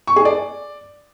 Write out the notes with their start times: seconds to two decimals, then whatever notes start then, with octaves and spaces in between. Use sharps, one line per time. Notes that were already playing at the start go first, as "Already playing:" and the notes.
0.07 C#6
0.16 G#4
0.25 D5